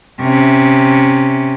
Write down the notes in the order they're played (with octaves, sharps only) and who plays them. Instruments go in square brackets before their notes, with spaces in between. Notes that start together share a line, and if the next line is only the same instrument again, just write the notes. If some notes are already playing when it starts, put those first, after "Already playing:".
[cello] C3 C#4